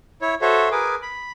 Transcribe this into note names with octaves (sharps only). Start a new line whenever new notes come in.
E4 C#5
F#4 A4 C5 C#5 E5
G#4 A#4 B4 G#5 D6
B5